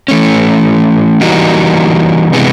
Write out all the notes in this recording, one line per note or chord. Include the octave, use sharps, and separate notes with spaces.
E3 A3 C#4
E3 G3 A#3 D#4 F#4
C3 E3 G#3 B3